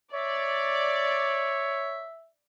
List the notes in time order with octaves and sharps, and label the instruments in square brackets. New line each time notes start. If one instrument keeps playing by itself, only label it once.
[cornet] C#5 [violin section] D5 [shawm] E5